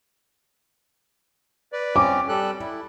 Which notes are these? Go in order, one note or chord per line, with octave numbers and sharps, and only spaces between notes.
B4 D5
C4 C#4 D6
G3 A4 F#6
E4